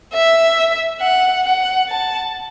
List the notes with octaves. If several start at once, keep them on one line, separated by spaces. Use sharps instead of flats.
E5
F#5
F#5
A5